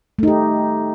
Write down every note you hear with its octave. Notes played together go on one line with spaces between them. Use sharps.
A3 D#4 G4